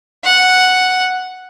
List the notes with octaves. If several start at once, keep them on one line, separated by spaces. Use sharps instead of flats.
F#5